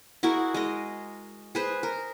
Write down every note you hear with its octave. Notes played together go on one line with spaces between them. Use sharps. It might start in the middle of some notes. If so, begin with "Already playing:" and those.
E4 F#4 G#4 A#4
G#3 A#4 D#5
G#4 B4 C5
A#4